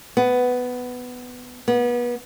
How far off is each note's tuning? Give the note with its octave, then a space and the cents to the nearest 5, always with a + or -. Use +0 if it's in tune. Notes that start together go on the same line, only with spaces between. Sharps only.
B3 +10
B3 -30